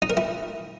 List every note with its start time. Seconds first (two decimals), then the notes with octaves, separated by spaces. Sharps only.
0.02 D#4
0.10 A#4
0.17 E4